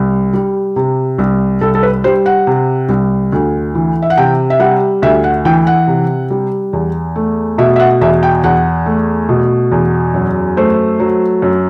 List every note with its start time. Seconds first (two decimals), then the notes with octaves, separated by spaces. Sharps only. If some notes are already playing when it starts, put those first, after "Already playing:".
Already playing: C2
0.33 G3
0.76 C3
1.18 C2
1.61 C2 A4
1.75 A4
1.83 B4
2.04 G3 C5
2.26 F#5
2.47 C3
2.89 C2
3.32 D2
3.75 E3
4.02 E5
4.10 F#5
4.17 C3 G5
4.50 E5
4.59 G3 F#5
5.02 D2 E5
5.24 F#5
5.45 E3 G5
5.67 F#5
5.88 C3
6.30 G3
6.73 E2
7.16 A3
7.58 B2 E5
7.76 E5
7.80 F#5
8.01 E2 E5
8.23 G5
8.44 E2 F#5
8.86 A3
9.29 B2
9.71 E2
10.14 F#2
10.57 A3 C5
11.00 F#3
11.42 F#2